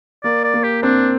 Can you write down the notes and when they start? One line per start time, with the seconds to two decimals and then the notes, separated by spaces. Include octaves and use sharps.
0.24 A#3 D5
0.44 D5
0.54 A#3
0.63 G4
0.83 C4 D4